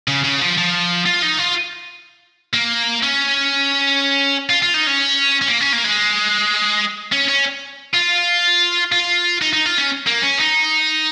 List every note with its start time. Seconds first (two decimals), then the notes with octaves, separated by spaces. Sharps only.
0.08 C#3
0.24 C#3
0.41 F3
0.57 F3
1.06 F4
1.22 D#4
1.39 F4
2.53 A#3
3.03 C#4
4.49 F4
4.62 F4
4.74 D#4
4.87 C#4
5.41 C#4
5.48 A#3
5.61 C#4
5.73 A#3
5.84 G#3
7.12 C#4
7.29 C#4
7.94 F4
8.92 F4
9.42 D#4
9.53 D#4
9.66 F4
9.78 C#4
10.07 A#3
10.23 C#4
10.40 D#4